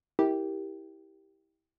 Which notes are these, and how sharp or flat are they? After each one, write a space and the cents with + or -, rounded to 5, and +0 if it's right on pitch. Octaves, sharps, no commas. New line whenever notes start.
E4 -25 G4 +0 A#4 +0